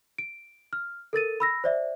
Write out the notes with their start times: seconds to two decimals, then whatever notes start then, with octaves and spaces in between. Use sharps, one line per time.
0.18 D7
0.73 F6
1.13 A4 A#4 A6 D#7
1.40 B5 E6 A#6
1.64 C5 D5 E5